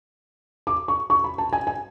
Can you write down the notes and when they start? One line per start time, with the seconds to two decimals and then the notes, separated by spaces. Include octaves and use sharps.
0.67 D6
0.88 C#6
1.10 C#6
1.24 B5
1.38 A5
1.53 G#5
1.67 G#5